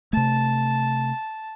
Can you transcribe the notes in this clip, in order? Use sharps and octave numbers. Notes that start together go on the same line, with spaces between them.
C3 A3 A5